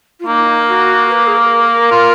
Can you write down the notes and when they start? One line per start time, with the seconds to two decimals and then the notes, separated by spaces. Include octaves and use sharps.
0.19 F4
0.26 A#3 D#4
0.67 F#4
1.08 B4
1.26 G#4
1.36 A#4
1.63 A#4
1.91 F4